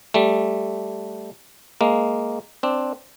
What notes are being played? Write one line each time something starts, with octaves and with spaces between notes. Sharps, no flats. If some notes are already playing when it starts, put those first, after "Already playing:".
G3 A3
G#3 A#3
C4 D4